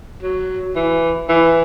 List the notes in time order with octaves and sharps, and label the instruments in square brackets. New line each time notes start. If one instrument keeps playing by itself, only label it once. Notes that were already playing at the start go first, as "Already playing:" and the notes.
[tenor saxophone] F#3
E3
E3